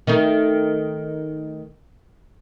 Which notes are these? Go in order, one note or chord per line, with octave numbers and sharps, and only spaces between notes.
D#3 A3 D#4